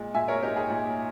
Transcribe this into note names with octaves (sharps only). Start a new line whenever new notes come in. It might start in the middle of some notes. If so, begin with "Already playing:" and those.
Already playing: A#2 G#3
A#2 E5 G#5
A#4 C#5
D#4 G4 A#4
G#4
A#2